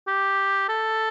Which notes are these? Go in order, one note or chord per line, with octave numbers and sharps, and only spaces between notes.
G4
A4